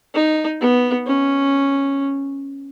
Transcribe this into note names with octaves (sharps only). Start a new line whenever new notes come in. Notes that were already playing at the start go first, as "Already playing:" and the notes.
D#4
B3
C#4